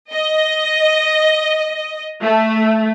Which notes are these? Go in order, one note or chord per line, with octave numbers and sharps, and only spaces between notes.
D#5
A3